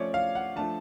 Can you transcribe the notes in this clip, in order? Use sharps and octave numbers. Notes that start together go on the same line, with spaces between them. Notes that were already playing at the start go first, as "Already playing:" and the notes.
Already playing: F3 A3 C#4 C#5 D5
F5
F#5
F3 A3 D4 A5